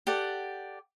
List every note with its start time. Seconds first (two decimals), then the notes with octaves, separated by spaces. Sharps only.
0.07 G4 A4 D5 F#5